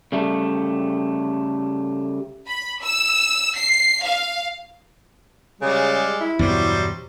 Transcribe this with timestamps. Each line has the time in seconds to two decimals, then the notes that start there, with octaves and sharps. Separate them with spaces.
0.12 C#3 G3 A3
2.48 B5
2.82 E6
3.57 C7
4.05 F5
5.61 C#3 G3 G#3
6.21 E4
6.39 E2 G2 B2 F#3 G3 C5